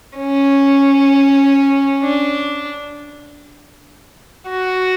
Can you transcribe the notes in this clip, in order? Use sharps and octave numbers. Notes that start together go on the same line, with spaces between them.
C#4
D4
F#4